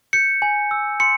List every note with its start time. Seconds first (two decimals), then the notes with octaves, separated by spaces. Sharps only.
0.13 G6 C#7
0.42 G#5
0.71 E6
1.00 C6 C#7